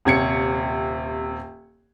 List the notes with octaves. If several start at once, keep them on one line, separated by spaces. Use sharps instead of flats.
D#1 C3 G#6 C#7